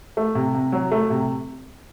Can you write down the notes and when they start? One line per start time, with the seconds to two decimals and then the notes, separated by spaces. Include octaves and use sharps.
0.17 A3
0.35 C3
0.54 C3
0.72 F#3
0.92 A3
1.10 C3